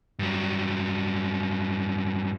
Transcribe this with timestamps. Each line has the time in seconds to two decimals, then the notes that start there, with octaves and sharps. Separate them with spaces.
0.19 G2 F#3